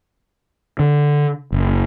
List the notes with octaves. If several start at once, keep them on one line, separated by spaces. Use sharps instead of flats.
D3
F#1